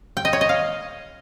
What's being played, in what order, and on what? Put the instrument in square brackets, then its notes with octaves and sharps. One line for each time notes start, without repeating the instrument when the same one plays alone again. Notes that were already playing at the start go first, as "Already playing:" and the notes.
[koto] G5
D#5
C#5
D#5
F5